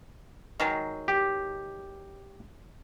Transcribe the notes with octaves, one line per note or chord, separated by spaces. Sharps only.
D#3 F#3 G#3
G4